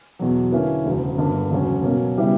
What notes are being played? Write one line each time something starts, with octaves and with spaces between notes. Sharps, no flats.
E2 B2 F#3
D3 A#3 C#4 E4 B4
E1 D2 C#3
G1 G2 D3 A#3
E1 D2 C#3 F#3 C#4
B2 F#3 A#3 C#4
C#3 G3 B3 E4